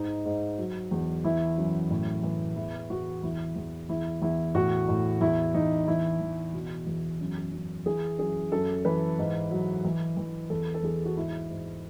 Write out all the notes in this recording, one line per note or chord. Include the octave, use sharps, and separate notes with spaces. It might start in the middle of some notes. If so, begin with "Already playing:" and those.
Already playing: G#2 D#4
G#2
F#3
E2
E3 E4
F#2
A2
E3
E2 E4
E2 F#4
E2 E4
E2
E2 E4
E2 E4
A2 F#4
A2
E2 E4
E2 D#4
E3 E4
E3
B2
E2
F#2
F#2
E3 G#4
F#2 G#4
F#2 A4
E3 B4
G#2
F#3
E3
E3
E2 A4
A4
E2 G#4
F#4
G#2 E4
G#2